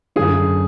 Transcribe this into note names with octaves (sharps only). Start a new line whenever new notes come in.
F#2 D3 G#4